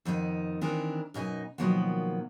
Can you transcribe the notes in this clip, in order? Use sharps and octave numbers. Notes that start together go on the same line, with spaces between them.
F2 D#3 B3 D#4
D#3 E3 C4 D4 A#4
F#2 B2 D#4 G#5
B2 D#3 F3 F#3 A#3 B3